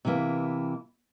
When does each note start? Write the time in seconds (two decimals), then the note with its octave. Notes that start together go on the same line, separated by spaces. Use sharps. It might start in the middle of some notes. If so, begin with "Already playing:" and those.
0.05 C3 E3 A#3 E4